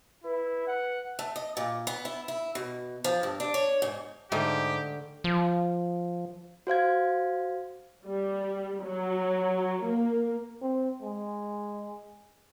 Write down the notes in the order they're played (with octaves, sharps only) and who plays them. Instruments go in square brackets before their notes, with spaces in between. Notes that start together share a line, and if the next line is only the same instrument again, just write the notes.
[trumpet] E4 [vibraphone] B4
[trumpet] F#5
[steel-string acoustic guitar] A3
D#5
A#2
B3
E4
E4
B2
F3
G2
D4
C#5
G#2
[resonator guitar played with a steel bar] G#2 [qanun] D3 A3 G5 [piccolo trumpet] G4
[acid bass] F3
[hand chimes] F#4 C5 F5 G#6
[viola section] G3
F#3
A#3
[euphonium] C4
G#3